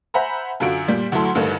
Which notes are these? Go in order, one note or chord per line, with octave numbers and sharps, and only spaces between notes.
C5 E5 F#5 G#5 A#5 B5
F#2 D3 F4 F#4 D7
A#2 G3
D2 F#3 E4 A4 C6
A1 G2 D3 D#3 A3